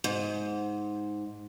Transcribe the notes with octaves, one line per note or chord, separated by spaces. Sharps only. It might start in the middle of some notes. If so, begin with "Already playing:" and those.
G#2